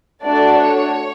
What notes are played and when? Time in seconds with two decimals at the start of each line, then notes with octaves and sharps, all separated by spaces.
0.22 A3 D4 F#4 D5
0.61 C#5